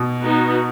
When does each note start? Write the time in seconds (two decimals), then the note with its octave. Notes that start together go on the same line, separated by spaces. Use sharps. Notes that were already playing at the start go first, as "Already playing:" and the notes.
Already playing: B2
0.20 B3 D#4 F#4